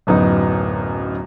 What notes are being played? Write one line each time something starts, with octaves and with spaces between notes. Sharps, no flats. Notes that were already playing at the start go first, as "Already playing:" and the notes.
D1 F#2 B3 D#4